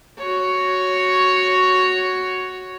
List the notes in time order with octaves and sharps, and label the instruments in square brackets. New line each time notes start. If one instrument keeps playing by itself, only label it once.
[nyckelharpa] F#4 C#5